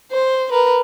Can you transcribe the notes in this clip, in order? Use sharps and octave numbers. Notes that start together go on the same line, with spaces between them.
C5
A#4 B4